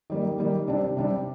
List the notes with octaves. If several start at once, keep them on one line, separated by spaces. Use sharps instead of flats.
D#3 G3 A#3
D#3 G3 A#3
C3 G3 D4
C3 G3 D4